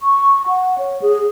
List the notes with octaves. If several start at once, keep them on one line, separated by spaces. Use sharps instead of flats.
C#6
F#5
C#5
G#4